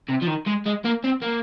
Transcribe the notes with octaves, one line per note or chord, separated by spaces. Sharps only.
C3
F3
D#3
G#3
G#3
A#3
C4
A#3